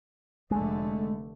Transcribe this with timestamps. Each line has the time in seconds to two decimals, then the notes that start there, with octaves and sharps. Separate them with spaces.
0.51 F1 D3 G#3 A3